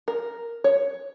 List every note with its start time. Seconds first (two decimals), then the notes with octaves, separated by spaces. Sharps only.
0.08 A#4
0.64 C#5